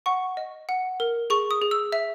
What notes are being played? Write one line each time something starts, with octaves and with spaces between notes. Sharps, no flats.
F#5 C#6
D#5
F#5
A#4
G#4 C#6
D#6
G#4
E6
E5